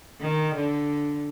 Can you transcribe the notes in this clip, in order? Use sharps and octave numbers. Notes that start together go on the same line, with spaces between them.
D#3
D3